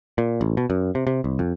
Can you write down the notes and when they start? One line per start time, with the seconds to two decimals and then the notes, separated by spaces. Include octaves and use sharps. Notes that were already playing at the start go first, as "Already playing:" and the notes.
0.18 A#2
0.41 A1
0.57 B2
0.70 F#2
0.95 C3
1.07 C3
1.24 C2
1.39 F2